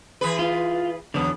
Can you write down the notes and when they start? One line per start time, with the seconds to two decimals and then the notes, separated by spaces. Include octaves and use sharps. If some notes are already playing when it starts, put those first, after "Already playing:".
0.21 E3 G#4 B4
0.39 F4
1.14 E2 D3 F#3 B3